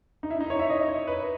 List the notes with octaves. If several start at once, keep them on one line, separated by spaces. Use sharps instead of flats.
D#4
E4
D#4
C#5
E5
D#5
C#5
B4